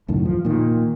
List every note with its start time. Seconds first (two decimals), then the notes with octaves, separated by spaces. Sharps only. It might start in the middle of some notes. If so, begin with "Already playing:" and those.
0.08 C#2 F#2 A2 D#3
0.25 F3
0.45 A#2 D#3